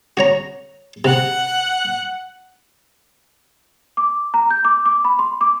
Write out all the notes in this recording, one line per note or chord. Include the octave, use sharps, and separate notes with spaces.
F#4 C#5 A#5
C3 F#5
D6
A#5
G6
D6
D6
B5
C6
D6